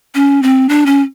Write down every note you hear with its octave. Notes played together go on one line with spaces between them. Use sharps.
C#4
C4
D4
C#4